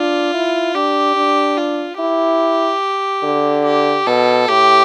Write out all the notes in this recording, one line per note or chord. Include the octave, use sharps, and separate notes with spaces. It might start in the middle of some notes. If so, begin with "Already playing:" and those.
Already playing: D4 F4
E4
D4 G4
D4
F4
E4 G4
D3
G4
B2 A4
A2 G4